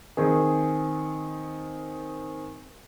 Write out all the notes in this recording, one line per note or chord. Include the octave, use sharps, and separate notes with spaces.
D#3 C4 G#4